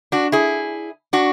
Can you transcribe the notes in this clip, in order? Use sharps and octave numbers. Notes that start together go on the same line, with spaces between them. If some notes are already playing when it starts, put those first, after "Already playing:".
D4 F#4
E4 G#4
D4 F#4